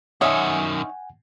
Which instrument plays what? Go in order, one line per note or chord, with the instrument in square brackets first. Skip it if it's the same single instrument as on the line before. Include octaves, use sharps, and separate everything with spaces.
[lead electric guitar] F#2 D#3 [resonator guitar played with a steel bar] D#4 C#5 E5 [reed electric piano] F#5 G#5